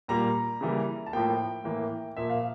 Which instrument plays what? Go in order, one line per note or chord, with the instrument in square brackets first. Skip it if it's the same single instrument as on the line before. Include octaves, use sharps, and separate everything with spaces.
[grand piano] A#2 G3 A#3 A#5
C#3 E3 G3 A#3
A5
A2 F3 A#3 G5
A2 E3 A#3
A#2 F3 A#3 E5
F5